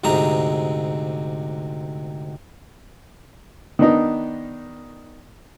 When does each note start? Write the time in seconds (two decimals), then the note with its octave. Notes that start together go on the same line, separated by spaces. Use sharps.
0.04 D2 G#2 C3 G#4 A#5
3.79 D#3 B3 D4 D#4